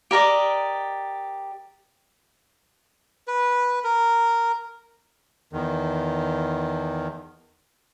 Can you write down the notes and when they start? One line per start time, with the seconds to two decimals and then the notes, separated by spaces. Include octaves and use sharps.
0.11 G4 A#4 D5 D#5
3.27 B4
3.84 A#4
5.53 E2 D#3